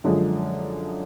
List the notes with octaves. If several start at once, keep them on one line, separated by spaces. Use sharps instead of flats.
F#2 D3 F3 G#3